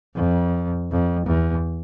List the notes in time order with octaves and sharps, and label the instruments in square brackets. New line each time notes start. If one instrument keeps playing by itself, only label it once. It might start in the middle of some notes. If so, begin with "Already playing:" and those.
[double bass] F2
F2
E2